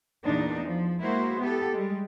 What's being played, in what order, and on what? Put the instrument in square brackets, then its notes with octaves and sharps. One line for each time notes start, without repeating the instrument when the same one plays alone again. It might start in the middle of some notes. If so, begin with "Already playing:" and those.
[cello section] E2 A#2 D4 D#4
F3
G#3 A#3 E4 F#4 C5
B3 G4 A4
G3 G#3